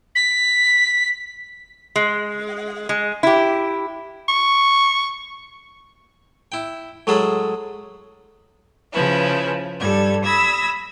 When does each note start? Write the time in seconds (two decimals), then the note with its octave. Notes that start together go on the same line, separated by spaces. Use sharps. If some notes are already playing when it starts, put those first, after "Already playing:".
0.15 B6
1.96 G#3
2.89 G#3
3.23 E4 G4
4.29 C#6
6.52 E4 G5
7.07 A2 F#3 G#3 G#4 A4 B5
8.91 C#3 F3 E4 B4
9.79 G2 A4 G#6
10.24 B5 D#6 E6 G#6 A#6